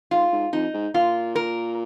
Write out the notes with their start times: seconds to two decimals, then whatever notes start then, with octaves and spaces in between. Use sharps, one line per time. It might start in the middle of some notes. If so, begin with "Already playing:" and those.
0.11 G#2 F4
0.32 G#2
0.53 F2 D#4
0.74 G#2
0.94 A#2 F4
1.35 A#4